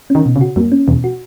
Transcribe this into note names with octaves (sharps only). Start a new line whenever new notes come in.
C#4
D#3
B2
C#3
F#4
F#2 A#3
C#4
E2 B2
F#4